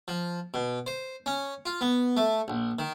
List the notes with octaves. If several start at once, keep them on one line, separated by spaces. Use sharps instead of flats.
F3
B2
C5
C#4
F4
B3
A3
A#1
D#3